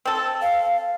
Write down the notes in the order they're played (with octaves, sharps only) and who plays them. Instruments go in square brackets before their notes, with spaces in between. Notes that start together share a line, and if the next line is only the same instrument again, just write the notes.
[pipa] C4 A4
[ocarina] F5